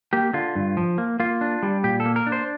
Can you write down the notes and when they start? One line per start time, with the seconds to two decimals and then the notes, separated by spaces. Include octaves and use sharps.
0.13 A#3 G4
0.34 D3 F4
0.55 G2
0.77 F3
0.98 A#3
1.20 A#3 F4
1.41 D4
1.63 G3
1.84 A#2 G4
2.00 A4
2.05 A#3
2.16 A#4
2.27 D4
2.32 C5